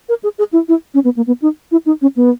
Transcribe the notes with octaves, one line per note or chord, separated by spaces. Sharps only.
A#4
G#4
G#4
E4
E4
C#4
B3
A#3
B3
D#4
E4
D#4
C#4
B3